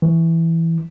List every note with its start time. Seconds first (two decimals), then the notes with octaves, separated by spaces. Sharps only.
0.02 E3